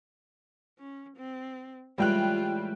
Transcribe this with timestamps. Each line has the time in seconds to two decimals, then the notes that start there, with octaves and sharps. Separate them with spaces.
0.79 C#4
1.17 C4
1.98 A2 E3 G3 G#3 F4 G5 F#6